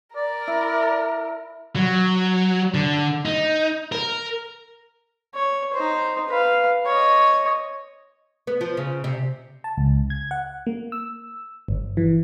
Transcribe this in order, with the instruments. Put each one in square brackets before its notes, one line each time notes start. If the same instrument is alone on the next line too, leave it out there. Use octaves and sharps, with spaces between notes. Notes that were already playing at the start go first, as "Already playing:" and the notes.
[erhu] A#4 [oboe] D5
[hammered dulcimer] E4
[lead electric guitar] F#3
D3
D#4
A#4
[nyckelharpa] C#5
D#4 C5
B4 F5
C#5 D#5
[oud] B3
F3
C#3
C3
[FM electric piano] A5
C#2
G#6
F#5
A#3
E6
G1
E3